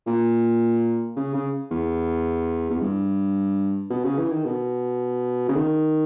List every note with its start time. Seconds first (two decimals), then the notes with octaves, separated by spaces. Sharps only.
0.06 A#2
1.16 C#3
1.34 C#3
1.71 E2
2.70 E2
2.81 G2
3.90 B2
4.05 C#3
4.18 E3
4.32 D#3
4.45 B2
5.48 C#3
5.55 D#3